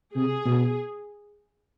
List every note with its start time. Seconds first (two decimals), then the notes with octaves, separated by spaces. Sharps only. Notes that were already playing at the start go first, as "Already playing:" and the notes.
0.15 C3 G#4
0.45 B2